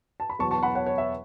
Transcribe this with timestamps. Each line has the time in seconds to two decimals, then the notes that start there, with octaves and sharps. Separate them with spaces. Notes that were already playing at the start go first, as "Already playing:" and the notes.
0.20 A5
0.30 B5
0.39 E2 B2 F#3 A5 C#6
0.51 A5 C#6
0.63 F#5 B5
0.75 C#5 F#5
0.86 C#5
0.98 E5